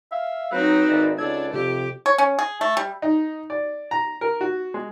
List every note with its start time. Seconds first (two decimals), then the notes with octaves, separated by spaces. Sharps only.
0.12 E5 F5
0.52 F#3 C4 D#4 B4
0.89 G#1 D5
1.18 C#2 D4 A4 G#6
1.53 F2 C3 G4
2.06 C#5
2.18 C#4
2.39 G#4
2.61 A3
2.77 G3
3.02 D#4
3.50 D5
3.91 A#5
4.21 A#4
4.41 F#4
4.74 G#3